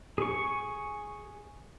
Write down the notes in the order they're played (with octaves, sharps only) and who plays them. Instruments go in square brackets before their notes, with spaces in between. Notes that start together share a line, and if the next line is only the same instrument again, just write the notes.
[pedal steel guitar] G#4 C#6